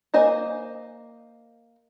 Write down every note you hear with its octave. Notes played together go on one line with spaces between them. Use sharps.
A#3 C5 D#5 G#5